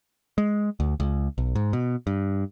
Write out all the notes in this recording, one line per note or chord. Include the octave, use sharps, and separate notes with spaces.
G#3
D2
C#2
B1
G#2
B2
G2